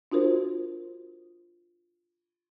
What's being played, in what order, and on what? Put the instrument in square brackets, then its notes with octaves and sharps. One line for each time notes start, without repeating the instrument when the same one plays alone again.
[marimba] D4 F4 F#4 A#4 C5